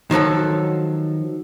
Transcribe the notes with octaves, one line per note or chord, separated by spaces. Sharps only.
D#3 F3 F#3 A4